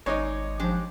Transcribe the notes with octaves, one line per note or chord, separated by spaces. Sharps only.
G#1 G#3 D#4 C#5 D5
F3 G#3 D4 G4